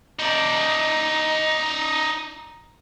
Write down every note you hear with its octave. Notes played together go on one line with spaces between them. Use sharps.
D#4 D5